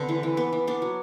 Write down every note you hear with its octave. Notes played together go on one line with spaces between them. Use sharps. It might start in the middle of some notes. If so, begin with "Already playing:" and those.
Already playing: D3 G3 B3 C4 D4
E3
E3
B3
E3
B3 D4
F#3